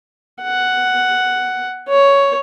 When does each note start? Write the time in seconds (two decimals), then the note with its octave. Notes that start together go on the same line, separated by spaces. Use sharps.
0.42 F#5
1.89 C#5